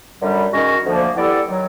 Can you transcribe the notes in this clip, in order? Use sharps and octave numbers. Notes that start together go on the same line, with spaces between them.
F#2 D3 G3
D#3 G#3 C#4 F#4
D2 D3 F3 A#3
G3 B3 E4 A4 D5
D#3 F#3